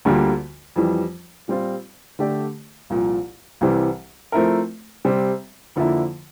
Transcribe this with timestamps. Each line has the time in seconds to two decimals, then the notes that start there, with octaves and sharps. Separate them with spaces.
0.05 D2 D3 G3 A#3 F4
0.76 F2 E3 G3
1.48 A#2 G3 C4 F4
2.19 D3 A3 D4 G4 D5
2.90 C2 A#2 F3
3.61 C2 C3 E3 G3
4.32 F3 A3 C4 E4 A#4
5.05 C3 G3 C4
5.76 F2 D3 F3 A#3 E4